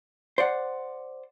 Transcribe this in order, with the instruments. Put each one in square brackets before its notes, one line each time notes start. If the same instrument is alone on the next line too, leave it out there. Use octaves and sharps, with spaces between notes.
[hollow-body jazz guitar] C5 D5 F#5